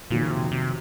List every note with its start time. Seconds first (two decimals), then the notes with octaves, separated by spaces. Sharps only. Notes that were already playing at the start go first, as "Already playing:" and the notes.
0.11 F2 A#2 D#3 F#3 A#3 D#4
0.22 C#3
0.30 C3
0.52 C3